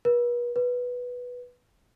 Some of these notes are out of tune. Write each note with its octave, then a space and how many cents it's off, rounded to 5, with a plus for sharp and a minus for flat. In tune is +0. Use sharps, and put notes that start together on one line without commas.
B4 -40
B4 -5